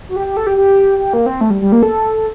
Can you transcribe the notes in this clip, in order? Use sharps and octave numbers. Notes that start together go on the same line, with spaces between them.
F#4
G4
G4
A4
G4
G4
G4
A#3
C4
A3
G3
G3
A#3
A4